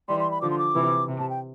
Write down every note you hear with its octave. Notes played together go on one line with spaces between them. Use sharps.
E3 G3 C6
C6
B5
D3 F3 D6
C6
D6
C3 E3
C3
A5
G5